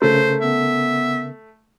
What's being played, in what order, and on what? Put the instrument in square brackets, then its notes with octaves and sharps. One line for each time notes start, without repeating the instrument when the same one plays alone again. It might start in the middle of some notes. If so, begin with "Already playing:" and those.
[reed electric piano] C#3 A#4 [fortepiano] A3 [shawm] C5
[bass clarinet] B3 [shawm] E5